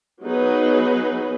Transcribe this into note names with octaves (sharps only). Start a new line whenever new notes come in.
F#3 B3 D#4 G#4 B4